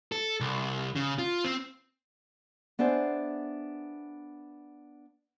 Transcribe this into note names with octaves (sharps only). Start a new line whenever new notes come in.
A4
C2
C#3
F4
C4
B3 D4 G#4 C5 E5